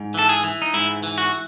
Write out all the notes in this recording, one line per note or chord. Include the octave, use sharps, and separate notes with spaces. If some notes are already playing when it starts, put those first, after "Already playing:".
Already playing: G#2
E3 A4
G#4
E3
D#4
G#2 E4
E3
F#4